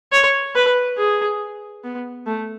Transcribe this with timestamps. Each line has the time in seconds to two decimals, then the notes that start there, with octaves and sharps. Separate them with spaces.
0.12 C#5
0.55 B4
0.98 G#4
1.84 B3
2.27 A3